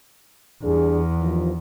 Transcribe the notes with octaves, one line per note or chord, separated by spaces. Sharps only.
E2 G3 D4 G#4
G2 D#3 F3